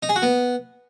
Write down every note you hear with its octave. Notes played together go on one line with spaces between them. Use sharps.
D#4
G#4
F#4
B3